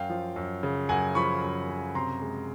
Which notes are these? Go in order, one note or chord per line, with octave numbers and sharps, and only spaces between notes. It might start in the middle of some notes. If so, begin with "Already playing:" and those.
Already playing: F#2 F5 G5
F3
F#2
C#3
F#2 F#5 G#5
F3 B5 C#6
F#2
C#3
C3 A#5 C6
G#3